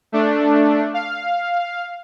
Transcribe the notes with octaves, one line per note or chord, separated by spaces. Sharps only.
A3 D4
F5